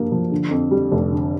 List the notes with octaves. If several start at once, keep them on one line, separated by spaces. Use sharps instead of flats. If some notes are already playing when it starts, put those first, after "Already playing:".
Already playing: G2 F3 A#3
F3
D3
F2
G3
F1
D3